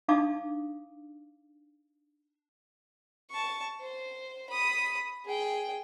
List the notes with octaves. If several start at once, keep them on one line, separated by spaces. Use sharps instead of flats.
D4 D#4 F5 A5 D6 D#6
A5 C#6
C5
B5 D#6
G#4 G5